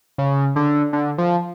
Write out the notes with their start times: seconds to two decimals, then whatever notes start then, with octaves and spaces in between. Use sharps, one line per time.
0.18 C#3
0.56 D3
0.93 D3
1.18 F3